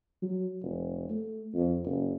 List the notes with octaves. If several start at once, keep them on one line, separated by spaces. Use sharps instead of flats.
F#3
F1
A3
F2
F#1